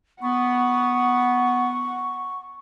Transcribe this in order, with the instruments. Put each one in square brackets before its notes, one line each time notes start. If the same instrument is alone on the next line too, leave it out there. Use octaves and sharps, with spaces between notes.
[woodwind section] B3 [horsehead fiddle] F#5 [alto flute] C#6